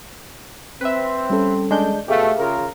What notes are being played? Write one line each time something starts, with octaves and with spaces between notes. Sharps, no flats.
C4 B4 E5
G3 C#4 A4
G#3 D4 G6
B2 A3 G4 G#4 E5 F5
C#3 F4 A#4